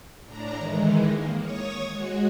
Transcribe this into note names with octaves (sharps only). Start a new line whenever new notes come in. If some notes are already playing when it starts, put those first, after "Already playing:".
A2 D4 A#5
D#3 E3 G#3
A#3
C#5 C#6 D#6
G#3 F#4